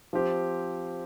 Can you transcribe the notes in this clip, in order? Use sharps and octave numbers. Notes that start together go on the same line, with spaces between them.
F3 C4 G4